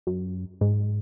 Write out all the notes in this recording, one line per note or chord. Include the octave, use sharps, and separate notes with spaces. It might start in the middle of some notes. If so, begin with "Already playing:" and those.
F#2
G#2